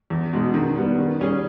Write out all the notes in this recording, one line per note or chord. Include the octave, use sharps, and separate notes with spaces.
E2
B2 G#3 D#4
D#3
G3 B3
D#3
G3 C#4 G#4